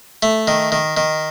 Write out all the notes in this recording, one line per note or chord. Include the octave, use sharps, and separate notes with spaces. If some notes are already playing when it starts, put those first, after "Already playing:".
A3
D#3
D#3
D#3